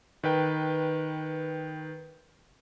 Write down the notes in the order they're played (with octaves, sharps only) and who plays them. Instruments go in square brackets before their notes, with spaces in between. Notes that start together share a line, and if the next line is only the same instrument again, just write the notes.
[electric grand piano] D#3 B4 G5